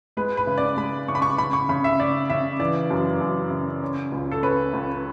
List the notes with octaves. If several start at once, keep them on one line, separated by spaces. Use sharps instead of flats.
G#3 B4
B4
C#3
D5
G#3 B5
C#3 C#6
B5
C#6
C#3 B5
C#6
C#3 B5
E5
C#3 D5
C#3 E5
E3 D5
F#2
F#2
C#3
C#4
C#2
A4
C#4 B4
C#2